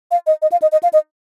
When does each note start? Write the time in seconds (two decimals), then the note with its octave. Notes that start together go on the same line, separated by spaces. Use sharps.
0.11 F5
0.27 D#5
0.42 D#5
0.52 F5
0.62 D#5
0.72 D#5
0.83 F5
0.93 D#5